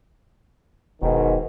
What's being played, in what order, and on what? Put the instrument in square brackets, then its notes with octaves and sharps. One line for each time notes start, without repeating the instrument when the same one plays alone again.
[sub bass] E1 [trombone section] G#2 B2 D#3